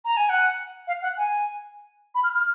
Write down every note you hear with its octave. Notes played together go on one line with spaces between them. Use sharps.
A#5
G#5
F#5
F5
F#5
G#5
B5
F6
F6